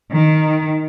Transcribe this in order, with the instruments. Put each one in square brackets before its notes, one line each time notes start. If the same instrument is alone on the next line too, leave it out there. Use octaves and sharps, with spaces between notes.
[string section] D#3